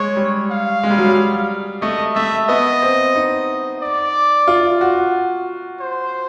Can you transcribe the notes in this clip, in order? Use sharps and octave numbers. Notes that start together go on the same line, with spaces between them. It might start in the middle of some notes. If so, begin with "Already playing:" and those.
Already playing: G#3 C#5
G3
F5
G#3
G3
F#3
G3
A3 D#5
A3 E5
B3 D#5
C4
D#4
D5
F4
F#4
C5